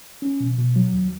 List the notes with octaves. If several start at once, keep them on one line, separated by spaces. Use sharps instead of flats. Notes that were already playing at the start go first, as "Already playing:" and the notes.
C#4
B2
B2
F#3
D#2